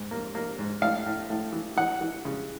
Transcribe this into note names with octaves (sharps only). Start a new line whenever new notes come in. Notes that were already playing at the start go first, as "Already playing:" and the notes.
Already playing: G#2
A#3
A#3
G#2
A2 F5
A2
A2
E3
E3 F#5
E3
C#3